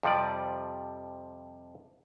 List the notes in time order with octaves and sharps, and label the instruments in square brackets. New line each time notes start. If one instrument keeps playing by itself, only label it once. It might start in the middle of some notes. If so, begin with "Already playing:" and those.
[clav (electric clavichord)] F2 C3 F3 G3 D5